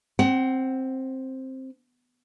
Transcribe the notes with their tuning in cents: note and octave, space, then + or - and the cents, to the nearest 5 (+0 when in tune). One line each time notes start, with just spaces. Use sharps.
C4 +10 F#5 +35